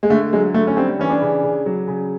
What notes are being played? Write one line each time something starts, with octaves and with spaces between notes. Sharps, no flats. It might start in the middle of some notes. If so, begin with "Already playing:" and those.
G#3
D3 A3
F#3 G#3
D3 A3
C#4
G3 C4
E3 C#4
D4
C#3
C#3
F#3
C#3